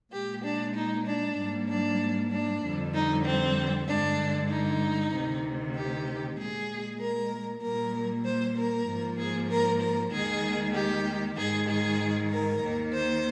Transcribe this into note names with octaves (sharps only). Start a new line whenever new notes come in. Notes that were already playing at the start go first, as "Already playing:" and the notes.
A#2 G#3 G4
D4
D#4
D4
G#2 G3 A#3
D4
D4
F2 D3 G3
D#4
C4
G2 D3 G#3 D4
D#4
D2 C3 D#3
G4
A#2 G#3 G#4
A#4
A#2 G3 A#3 A#4
C5
A#4
G#2 F3 A#3
G#4
A#4
A#4
D#2 D#3 G#3 G#4
G4
G#2 D#3 G#3 G#4
G#4
A#4
D#2 D#3 A#3
C5